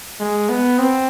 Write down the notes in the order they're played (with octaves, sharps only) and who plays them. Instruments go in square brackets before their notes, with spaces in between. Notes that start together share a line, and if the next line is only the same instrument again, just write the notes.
[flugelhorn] G#3
B3
C4